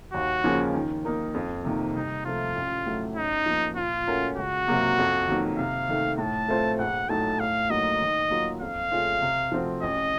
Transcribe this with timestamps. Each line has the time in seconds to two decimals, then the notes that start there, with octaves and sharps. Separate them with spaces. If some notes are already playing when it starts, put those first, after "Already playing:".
0.13 D#2 F#4
0.44 C#3 F3 A#3 C#4
0.74 D#3
1.05 A#3 D#4 A#4
1.34 F2
1.64 C3 D#3 A#3
1.95 C2 D#4
2.25 C3 F3 A3 F4
2.56 A1
2.86 A2 F#3 A3
3.16 F#2 D#4
3.46 F3 A#3
3.76 A#2 F4
4.07 A3 C#4 F#4 A#4
4.37 C#2 F#4
4.68 C3 F#3 A#3
4.98 F2
5.29 D#3 F#3 A#3
5.58 C3 F5
5.89 D#3 A3
6.18 A2 A5
6.48 A3 C4 F4 C5
6.79 A#1 F#5
7.09 A2 F#3 A3 D#4 A5
7.39 A2 F5
7.70 F#3 A#3 D#4 F#4 D#5
8.01 D#3
8.31 F#3 A#3 F4
8.61 F2 F5
8.91 C#3 A3 C#4 F4
9.22 C3
9.52 F3 A3 C4 F#4
9.82 A1 D#5